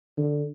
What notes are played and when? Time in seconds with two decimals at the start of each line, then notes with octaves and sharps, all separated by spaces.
0.18 D3